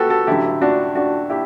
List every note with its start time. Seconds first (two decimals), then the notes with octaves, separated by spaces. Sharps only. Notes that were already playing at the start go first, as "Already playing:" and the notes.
Already playing: F#2 F#4 G4 A4 B4
0.10 F#4 A4
0.27 A1 G2 D3 F#3 E4 G4
0.61 D4 F#4
0.95 D4 F#4
1.30 E4 G4